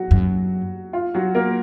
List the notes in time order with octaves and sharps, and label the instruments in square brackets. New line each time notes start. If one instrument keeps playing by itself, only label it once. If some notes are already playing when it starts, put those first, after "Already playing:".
Already playing: [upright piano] F#3 F#4
[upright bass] F#2
[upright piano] F4
F#3 F#4
A#3 A#4